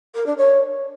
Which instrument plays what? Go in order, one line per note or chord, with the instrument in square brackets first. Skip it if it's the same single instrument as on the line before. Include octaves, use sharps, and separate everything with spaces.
[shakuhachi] A#4
D4
C#5